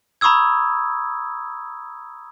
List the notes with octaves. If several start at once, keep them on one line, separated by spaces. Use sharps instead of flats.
A#5 B5 C#6 D#6 E6 G#6